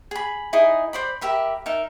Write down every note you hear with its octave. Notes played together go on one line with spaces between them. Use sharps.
G#4 B5
D#4 E4 G#4 D#5
C5 D5 B5
G4 A#4 E5 B5
D#4 A#4 E5